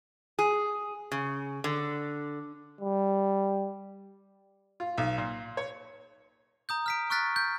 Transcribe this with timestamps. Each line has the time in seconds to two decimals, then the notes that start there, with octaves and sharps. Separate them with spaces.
0.39 G#4
1.12 C#3
1.64 D3
2.81 G3
4.80 F4
4.98 B1
5.18 A#2
5.57 C#5
6.69 A#5 D#6 G6
6.86 F6 B6 D7
7.10 C#6 D#6 F6 F#6 A6 B6
7.36 G6